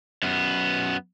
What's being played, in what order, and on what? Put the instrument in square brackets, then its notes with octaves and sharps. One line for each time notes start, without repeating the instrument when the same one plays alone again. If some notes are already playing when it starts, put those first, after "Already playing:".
[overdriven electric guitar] F#2 B3